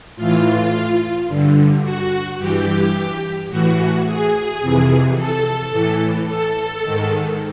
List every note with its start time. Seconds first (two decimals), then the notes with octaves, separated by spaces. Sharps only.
0.16 A2 E3 F4
1.27 G2 D3
1.83 F#4
2.39 G2 E3 G4
3.49 A2 E3 F#4
4.05 G#4
4.61 F2 C3 E3
5.16 A4
5.71 A2 E3
6.27 A4
6.83 G#2 D#3